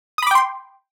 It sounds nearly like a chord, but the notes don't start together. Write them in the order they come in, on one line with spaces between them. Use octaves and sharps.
D#6 B5 D6 G5 C6